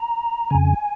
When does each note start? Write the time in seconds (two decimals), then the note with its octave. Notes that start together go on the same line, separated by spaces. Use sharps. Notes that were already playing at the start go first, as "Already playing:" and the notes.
Already playing: A#5
0.50 F2 C#3 G#5